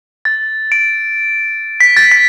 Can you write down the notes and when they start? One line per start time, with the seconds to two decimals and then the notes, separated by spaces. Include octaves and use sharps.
0.25 A6
0.72 D7
1.80 B6
1.97 A6
2.12 B6